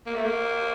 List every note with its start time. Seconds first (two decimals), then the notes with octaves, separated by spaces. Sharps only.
0.07 A#3
0.15 A3
0.25 A#3